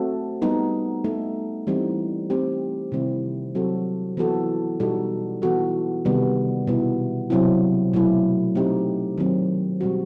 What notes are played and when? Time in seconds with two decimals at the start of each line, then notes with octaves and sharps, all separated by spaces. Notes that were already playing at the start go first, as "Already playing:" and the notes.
Already playing: A3 C4 F#4 A4
0.42 G3 B3 D#4
1.04 A3 D#4 A4
1.67 E3 G3 C4 D#4
2.30 A3 C4 D#4 G4
2.92 C3 D#3 G3 C4 E4
3.55 F#3 C4 F#4 A4
4.17 E3 B3 F#4 A4
4.80 B2 G3 D#4 F#4 A4
5.42 E3 B3 F#4 A4
6.05 C3 D#3 G3 B3
6.67 B2 G3 B3 E4
7.30 C3 F#3 C4 E4
7.93 B2 F#3 A3 E4
8.55 A3 C4 D#4 G4
9.18 D#3 F#3 C4
9.81 B2 G3 C4 F#4